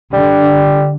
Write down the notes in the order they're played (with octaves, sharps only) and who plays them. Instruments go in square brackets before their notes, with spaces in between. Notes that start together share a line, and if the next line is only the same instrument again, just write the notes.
[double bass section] D3 [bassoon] G3